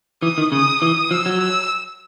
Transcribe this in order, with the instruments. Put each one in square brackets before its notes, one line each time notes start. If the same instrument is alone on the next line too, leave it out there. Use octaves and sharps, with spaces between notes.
[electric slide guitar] E3 [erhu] D#6
[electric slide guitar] D#3
[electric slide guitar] C#3 [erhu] D#6
[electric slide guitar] E3 [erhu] D#6
[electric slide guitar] F3 [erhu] E6
[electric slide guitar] F#3
[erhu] E6